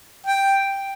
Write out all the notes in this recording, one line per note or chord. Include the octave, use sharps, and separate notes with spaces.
G5